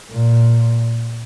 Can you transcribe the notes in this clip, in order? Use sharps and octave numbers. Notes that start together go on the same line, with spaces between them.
A#2